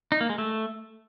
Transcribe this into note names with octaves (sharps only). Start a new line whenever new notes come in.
D#4
A#3
G#3
A3